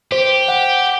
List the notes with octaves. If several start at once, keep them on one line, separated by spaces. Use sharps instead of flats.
G4 C5
F#5